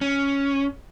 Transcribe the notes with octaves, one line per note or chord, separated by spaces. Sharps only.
C#4